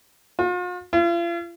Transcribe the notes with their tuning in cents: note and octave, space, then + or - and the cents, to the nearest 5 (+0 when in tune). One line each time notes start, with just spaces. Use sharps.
F4 +45
F4 -40